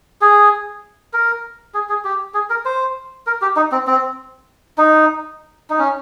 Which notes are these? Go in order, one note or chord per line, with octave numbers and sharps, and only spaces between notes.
G#4
A#4
G#4
G#4
G4
G#4
A#4
C5
A#4
G4
D#4
C4
C4
D#4
D#4
C#4